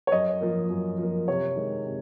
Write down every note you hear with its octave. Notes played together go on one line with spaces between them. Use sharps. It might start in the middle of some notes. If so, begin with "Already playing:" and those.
C#5
F#2 D#5
F3 A#3
F#2
F3 A#3
C3 C#5
D#3 G#3
C3